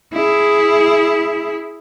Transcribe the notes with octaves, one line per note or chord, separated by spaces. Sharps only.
E4 G#4